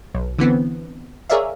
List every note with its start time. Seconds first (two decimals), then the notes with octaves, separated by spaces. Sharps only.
0.15 B1
0.39 D3 E3 B3 C4
1.29 G#4 A#4 C#5 D5 E5 F5